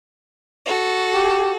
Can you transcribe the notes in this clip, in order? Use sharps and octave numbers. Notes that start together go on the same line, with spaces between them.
F#4 A4
G4